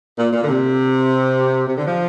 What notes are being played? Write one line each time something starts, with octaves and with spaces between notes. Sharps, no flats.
A#2
A#2
D3
C3
C3
D3
F3